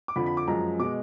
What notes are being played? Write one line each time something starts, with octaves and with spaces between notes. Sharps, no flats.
D6
F2 D3 F3 B5
B5
D6
F#2 F3 G#3 A#5
B2 G#3 D6